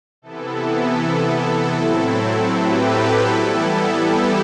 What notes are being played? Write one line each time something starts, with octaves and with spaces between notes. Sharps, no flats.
C3 E3 B3 E4 A4
A4
A2 F#3 C4 E4
G4 B4
A4
E3 G3 B3 E4 A4
G4